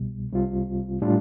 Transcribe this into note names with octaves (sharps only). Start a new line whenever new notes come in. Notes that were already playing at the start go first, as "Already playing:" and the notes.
Already playing: C2 B2 G3
C2 C3 G3 C4 F4
A2 G3 D4 F4